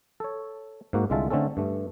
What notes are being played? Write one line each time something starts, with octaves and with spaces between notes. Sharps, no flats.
A4 C#5
G#2 A#3 F#4
C2 D3 G#3 F4 E5 A5
D3 A3 C4 C#4 A4
G2 A3